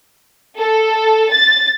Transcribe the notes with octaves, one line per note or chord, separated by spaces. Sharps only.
A4
A6